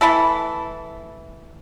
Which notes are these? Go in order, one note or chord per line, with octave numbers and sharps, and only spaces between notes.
E3 A3 E4 A4